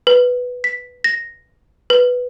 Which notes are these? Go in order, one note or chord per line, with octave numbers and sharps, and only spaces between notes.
B4
B6
A#6
B4